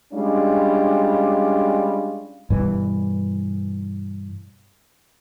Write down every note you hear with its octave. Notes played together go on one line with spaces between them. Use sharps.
G3 G#3 C#4 D4 F4
G2 B2 E3